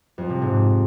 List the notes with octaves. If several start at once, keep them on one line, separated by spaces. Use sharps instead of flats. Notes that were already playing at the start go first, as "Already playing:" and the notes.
F2
C3
G#2